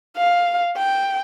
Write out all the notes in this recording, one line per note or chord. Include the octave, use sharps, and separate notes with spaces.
F5
G5